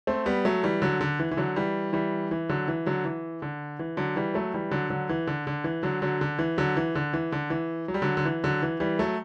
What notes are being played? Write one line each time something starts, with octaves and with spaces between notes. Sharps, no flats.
A3 C4
G3 B3
F#3 A3
E3 G3
D3 F#3
D3
E3
E3
D3 F#3
E3 G3
E3 G3
E3
D3 F#3
E3
D3 F#3
E3
D3
E3
D3 F#3
E3 G3
F#3 A3
E3 G3
D3 F#3
D3 F#3
E3
D3
D3
E3
D3 F#3
D3 F#3
D3
E3
D3 F#3
E3
D3
E3
D3
E3
F#3
G3
D3 F#3
D3
E3
D3 F#3
E3
E3 G3
F#3 A3